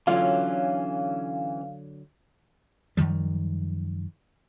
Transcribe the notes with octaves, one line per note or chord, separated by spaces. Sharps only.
D3 E3 F#3 C#4 F4 F5
F#2 D#3 F3 G3